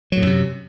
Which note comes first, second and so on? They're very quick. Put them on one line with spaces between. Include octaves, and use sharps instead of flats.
F#3 A2 F#2 C3